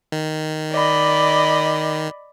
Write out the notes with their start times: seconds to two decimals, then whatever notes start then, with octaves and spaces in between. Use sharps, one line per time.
0.12 D#3
0.71 D5 D#5 B5